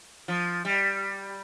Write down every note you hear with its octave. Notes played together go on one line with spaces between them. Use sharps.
F3
G3